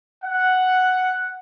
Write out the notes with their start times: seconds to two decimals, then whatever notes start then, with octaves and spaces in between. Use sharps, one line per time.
0.25 F#5